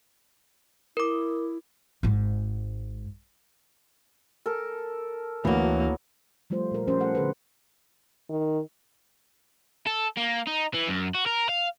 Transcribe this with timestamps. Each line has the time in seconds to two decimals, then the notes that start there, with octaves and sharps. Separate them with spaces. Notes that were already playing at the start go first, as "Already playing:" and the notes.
0.97 E4 A#4 D6
2.03 G#1 G#2
4.46 A4 A#4
5.45 D2 E3 F#3 A#3 B3
6.50 F3 G3 A3 F4 C5
6.71 A#2 A#4
6.87 F3 C#4 G4 A#4 C5
6.99 A3 C#4 A4 F#5
7.15 D3 G#4 B4
8.30 D#3
9.87 A4
10.17 A#3
10.47 D#4
10.74 E3
10.88 F#2
11.15 F#4
11.26 A#4
11.49 F5